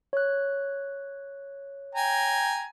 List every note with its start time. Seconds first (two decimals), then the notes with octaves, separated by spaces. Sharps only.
0.13 C#5 F#6
1.95 G5 G#5 A#5